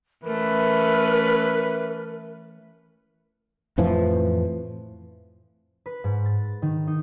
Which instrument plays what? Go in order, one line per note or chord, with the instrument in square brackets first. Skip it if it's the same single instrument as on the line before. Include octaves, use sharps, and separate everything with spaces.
[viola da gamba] E3 A3 C#4 [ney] A#4 [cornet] B4
[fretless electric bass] F2 A2 E3 F3
[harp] B4
G#2
A6
D#3
D#4